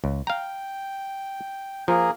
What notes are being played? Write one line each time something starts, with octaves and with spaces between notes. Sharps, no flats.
C#2
F5 G5 A#5
F3 A#3 G#4 A#4